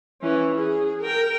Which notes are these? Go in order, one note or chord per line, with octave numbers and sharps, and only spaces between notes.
E3 C#4
G#4
A#4 G5